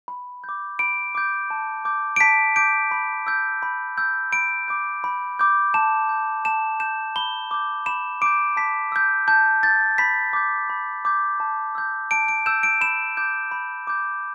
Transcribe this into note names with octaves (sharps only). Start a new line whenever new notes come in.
B5
G6
D6
B5 D7
D6 G6
A5
D6 G6
D7
A5 B6
D6 G6 D7
B5
E6 G6
B5
E6 G6
B5 D7
D6 G6
B5
D6 G6
A5 E7
G6
A5 E7
G6 E7
B5 G7
D6 G6
B5 E7
D6 G6 D7
A5 B6
E6 G6
A5 G6
E6 G6 A6
B5 B6
D6 G6
B5
D6 G6
A5
E6 G6
A5 D7
D7
E6 G6 E7
D7
B5 E7
D6 G6
B5
D6 G6